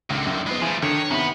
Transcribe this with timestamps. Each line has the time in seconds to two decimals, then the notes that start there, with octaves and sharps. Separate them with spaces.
0.10 C#2 D3 D#3
0.26 F#2
0.47 G#3 B3 F4 B5
0.62 E3 F3 A3 F4 G#4
0.83 D3 D#3 C#5
1.11 F#2 C3 D#3 B3 B5